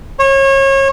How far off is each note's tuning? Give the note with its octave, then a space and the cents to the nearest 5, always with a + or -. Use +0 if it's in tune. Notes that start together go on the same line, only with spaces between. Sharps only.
C#5 -30